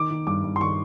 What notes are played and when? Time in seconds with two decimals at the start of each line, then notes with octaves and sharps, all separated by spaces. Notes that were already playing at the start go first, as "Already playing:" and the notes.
Already playing: D#3 D6
0.10 D#3
0.27 G2 D6
0.44 G2
0.56 C6
0.61 D#3 C#6